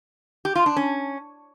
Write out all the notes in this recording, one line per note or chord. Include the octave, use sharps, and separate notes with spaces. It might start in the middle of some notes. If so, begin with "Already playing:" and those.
G4
F4
D4
C#4